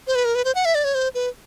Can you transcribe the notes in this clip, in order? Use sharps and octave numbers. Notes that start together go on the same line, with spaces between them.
C5
B4
A#4
B4
C5
F#5
E5
D5
C#5
C5
B4